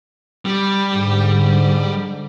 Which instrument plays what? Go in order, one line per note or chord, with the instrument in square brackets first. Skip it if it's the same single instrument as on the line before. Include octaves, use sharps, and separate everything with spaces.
[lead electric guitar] G3
[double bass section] G#2 D3